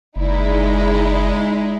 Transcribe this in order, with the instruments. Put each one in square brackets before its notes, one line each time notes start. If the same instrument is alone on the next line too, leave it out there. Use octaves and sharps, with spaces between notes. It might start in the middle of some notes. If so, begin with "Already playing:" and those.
[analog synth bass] F#1 [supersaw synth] G#3 [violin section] D#4 E4 D5